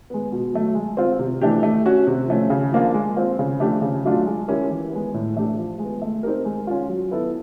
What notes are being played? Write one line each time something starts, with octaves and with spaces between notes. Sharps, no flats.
G#3 B3
B2
F#3 A3
G#3
C4 F4
C3
E3 A3 D4 G4
A3
C#4 F#4
C3
F3 A3 C#4
C#3
F3 A#3 D4 F4
G#3
C4 F4
C#3
F3 A3 D4 G4
C#3
F#3 A3 D4 F4
G#3
C#4 E4 G4 A#4
E3
G#3 B3
A2
E3 A3 D4 G4
F3
G#3 B3
A3
C4 D#4 G4 A#4
G#3
C#4 F4
F#3
B3 E4 A4